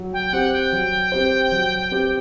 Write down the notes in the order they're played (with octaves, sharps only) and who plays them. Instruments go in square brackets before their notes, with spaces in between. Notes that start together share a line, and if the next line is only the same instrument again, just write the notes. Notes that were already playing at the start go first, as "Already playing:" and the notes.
Already playing: [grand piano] F#3
[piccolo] G5
[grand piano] C4 G4 C5 [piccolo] F#5
[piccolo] G5
[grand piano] F#3
C4 G4 C5
F#3
C4 G4 C5